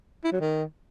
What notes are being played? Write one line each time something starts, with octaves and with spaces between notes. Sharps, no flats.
E4
F#3
D#3